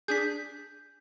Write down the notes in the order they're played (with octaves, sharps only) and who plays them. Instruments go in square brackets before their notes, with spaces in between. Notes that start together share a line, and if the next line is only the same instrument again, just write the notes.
[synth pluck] D4 G#4 [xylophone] G6 B6